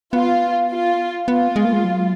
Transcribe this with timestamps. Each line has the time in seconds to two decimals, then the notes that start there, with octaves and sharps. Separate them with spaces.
0.13 B3 F4
0.70 F4
1.28 B3 F4
1.56 G#3
1.65 A#3
1.73 G#3
1.84 F#3